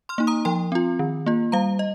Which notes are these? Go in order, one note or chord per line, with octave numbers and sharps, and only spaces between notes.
C6 F6
A#3 D#4
A#5 D#6
F3 G5 C6
C4 F4
D#3
A#3 F4
G3 F5 A#5
D#5